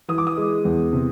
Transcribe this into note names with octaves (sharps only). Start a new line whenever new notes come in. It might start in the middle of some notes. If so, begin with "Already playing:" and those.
E3 D#6
D6
D#6
G#3
E2
C3